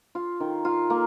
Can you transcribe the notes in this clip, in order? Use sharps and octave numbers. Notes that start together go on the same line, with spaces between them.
F4
D#3
F4
A#3